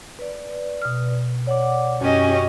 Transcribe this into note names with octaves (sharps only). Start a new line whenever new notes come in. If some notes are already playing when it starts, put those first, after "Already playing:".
B4 D5
B2 F6
C#5 D5 F#5 D6
F#2 C#4 F#4 G4 D#5